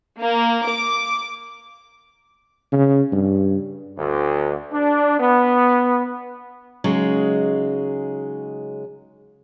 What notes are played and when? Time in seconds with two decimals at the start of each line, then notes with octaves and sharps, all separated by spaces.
0.21 A#3
0.66 D6
2.72 C#3
3.12 G2
3.98 D2
4.73 D4
5.19 B3
6.84 C#3 F#3 G#3 D#4